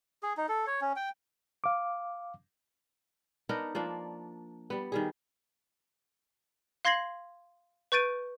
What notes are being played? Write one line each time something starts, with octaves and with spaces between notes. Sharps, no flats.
G#4
D#4
A4
C#5
C#4
G5
F5 D6
B3 D4 D#4 A#4
F3 A#3 D4
G3 B3
D#3 G3 G#4
F5 C6 G#6 A#6 C7 F#7
B4 C#6 G6 A6 D7 D#7